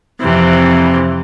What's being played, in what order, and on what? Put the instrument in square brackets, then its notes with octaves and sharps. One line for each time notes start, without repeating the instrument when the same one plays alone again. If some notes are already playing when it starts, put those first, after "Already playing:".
[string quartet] F2 C3 E3